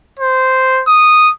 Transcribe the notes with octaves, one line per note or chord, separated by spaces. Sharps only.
C5
D#6